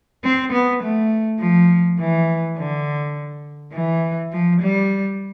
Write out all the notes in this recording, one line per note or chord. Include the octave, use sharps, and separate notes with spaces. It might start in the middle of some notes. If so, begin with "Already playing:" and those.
C4
B3
A3
F3
E3
D3
E3
F3
G3